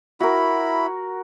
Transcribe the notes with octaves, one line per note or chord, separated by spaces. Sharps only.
E4 F#4 A#4 B5